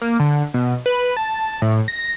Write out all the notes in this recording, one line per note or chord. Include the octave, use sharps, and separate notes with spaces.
A#3
D3
B2
B4
A5
A2
A#6